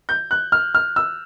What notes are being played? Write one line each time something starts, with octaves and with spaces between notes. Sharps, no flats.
G6
F#6
F6
F6
E6